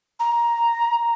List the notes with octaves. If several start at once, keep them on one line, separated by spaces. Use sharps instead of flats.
A#5